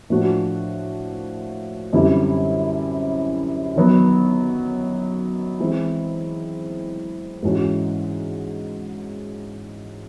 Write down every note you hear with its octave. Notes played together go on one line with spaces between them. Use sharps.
A2 F3 A#3 D4 F#4
F#2 D3 G3 C4 E4
D#3 F#3 B3
E3 G#3 C4 E4
G#2 E3 G#3 C#4 F#4